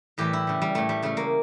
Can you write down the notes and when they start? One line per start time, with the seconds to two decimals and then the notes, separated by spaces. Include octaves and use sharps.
0.18 A2 E3 G3 G4
0.33 E4
0.47 C#3 G3
0.62 G3
0.75 A2 G3 A3
0.89 G3
1.03 C#3 G3 A3
1.17 A#3